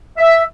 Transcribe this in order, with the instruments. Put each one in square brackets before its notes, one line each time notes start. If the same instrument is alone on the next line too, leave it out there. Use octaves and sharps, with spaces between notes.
[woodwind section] E5